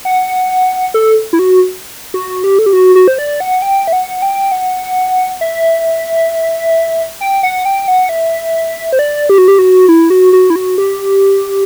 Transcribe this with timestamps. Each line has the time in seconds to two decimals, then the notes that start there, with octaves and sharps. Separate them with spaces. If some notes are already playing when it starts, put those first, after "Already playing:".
0.05 F#5
0.94 A4
1.33 E4
1.39 F#4
2.14 F#4
2.44 G4
2.59 A4
2.66 G4
2.73 F#4
2.95 F#4
3.08 C5
3.19 D5
3.40 F#5
3.62 G5
3.87 E5
3.93 F#5
4.22 G5
4.52 F#5
5.41 E5
7.21 G5
7.43 F#5
7.65 G5
7.88 F#5
8.09 E5
8.93 C5
8.99 D5
9.29 G4
9.38 F#4
9.48 G4
9.59 F#4
9.89 E4
10.10 F#4
10.33 F#4
10.50 E4
10.56 F#4
10.78 G4